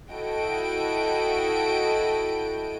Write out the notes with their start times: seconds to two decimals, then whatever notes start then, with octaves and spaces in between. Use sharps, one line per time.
0.12 E4 F#4 A4 D#5 G5 D7